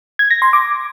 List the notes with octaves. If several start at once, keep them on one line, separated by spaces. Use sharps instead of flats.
G#6
A#6
C6
D6